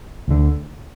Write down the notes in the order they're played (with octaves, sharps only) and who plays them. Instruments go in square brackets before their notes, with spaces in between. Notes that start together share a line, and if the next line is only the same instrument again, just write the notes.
[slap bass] D2 D3